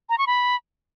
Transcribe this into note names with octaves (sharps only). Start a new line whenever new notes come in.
A#5
C#6
B5